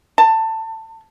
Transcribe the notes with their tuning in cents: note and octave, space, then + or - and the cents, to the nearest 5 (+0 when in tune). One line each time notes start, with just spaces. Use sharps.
A5 +20